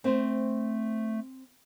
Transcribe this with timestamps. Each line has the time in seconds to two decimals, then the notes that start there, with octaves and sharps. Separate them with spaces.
0.04 A3 C4 C5